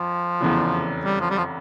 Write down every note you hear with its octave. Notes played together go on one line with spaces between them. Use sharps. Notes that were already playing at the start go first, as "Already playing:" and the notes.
Already playing: F2 F3
F1 E2 C#3 E3
G3
F3
G3
F3